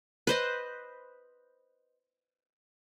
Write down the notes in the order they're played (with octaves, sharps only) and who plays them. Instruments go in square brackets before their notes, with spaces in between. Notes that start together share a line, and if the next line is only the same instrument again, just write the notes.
[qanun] B4 C5 D#5